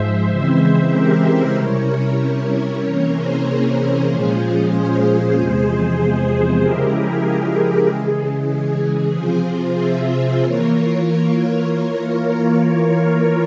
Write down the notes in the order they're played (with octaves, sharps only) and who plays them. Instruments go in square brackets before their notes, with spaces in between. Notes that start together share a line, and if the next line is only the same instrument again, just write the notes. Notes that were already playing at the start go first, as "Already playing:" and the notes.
Already playing: [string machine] G#2 F3 G#3 C5 E5
C#3 E3 G#3 C4 E4 C5 E5
G4 A#4
C3 G3 C#4 E4 A#4 C#5
C3 E3 A#3 C#4 A#4 C#5
G#4 C5
A#2 F3 G#3 C#4 F4
G#4 C5
E2 C3 F3 G#3
C#3 F3 G#3 E4 G4 A#4
G#4
C#3 E3 G#3
G#4
C3 F3 C4 F4 G#4 C5
C5 E5
E3 A#3 F4 A#4 C#5